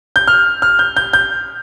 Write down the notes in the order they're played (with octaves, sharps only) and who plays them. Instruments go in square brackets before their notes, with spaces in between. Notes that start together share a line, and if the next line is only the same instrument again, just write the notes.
[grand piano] G6
F6
F6
G6
G6
G6